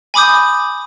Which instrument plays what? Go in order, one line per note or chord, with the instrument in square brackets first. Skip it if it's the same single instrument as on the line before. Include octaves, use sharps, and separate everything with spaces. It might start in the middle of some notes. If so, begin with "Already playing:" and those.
[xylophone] G#5 B5 D6 D#6 G6